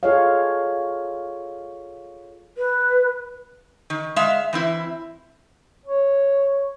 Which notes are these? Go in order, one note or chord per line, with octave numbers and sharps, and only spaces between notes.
F4 G#4 A4 C#5 D#5 F5
B4
D#3
G#3 E5 F5
E3 C4 E4
C#5